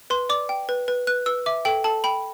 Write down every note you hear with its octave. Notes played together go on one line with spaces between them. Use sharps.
B4 C6
D5 D6
G5
B4
B4
B4 F#6
B4 E6
E5 D6
A4 G5
A4 A5
G5 B5